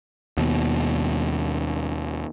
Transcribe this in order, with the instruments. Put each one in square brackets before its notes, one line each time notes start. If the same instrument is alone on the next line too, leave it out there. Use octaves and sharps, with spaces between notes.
[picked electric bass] D#2 B2